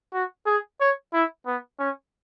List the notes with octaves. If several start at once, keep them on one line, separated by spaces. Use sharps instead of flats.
F#4
G#4
C#5
E4
B3
C#4